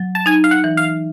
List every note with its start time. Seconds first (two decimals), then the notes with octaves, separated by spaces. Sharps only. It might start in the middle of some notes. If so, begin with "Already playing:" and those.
Already playing: F#3
0.15 A5
0.26 D#4 G#5
0.44 F5
0.51 F#5
0.64 E3
0.77 F5